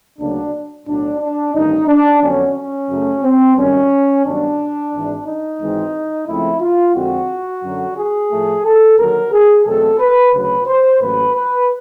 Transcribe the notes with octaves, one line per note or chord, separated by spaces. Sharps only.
D2 C#3 F#3 A#3 D4
B1 A2 F#3 D4
D4
A1 G2 D#3 D#4
D4
F2 D3 F#3 B3 C#4
C#4
F#2 C#3 F#3 A3
C4
G#1 F#2 D#3 G3 C#4
G2 D#3 F#3 B3 D4
G#1 G#2 E3
D#4
G#1 G#2 E3 G#3 C4
C#2 C#3 F3 A3 C4 E4
F4
F2 D3 F3 G#3 C4 F#4
F#2 D3 F#3
G#4
A2 F3 A3
A4
D#2 D3 F#3 A#4
G#4
E2 B2 F#3 A3 C4 A4
B4
D2 C#3 F#3 B4
C5
A1 A2 F#3 A#3 B4
B4